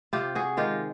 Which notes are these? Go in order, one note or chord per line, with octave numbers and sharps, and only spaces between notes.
C3 F4 G4
F#4 G#4
D#3 G#3 F4 G4